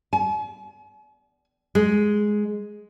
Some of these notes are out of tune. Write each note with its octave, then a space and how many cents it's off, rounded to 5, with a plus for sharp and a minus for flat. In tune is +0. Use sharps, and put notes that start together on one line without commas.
G#5 +45
G#3 +5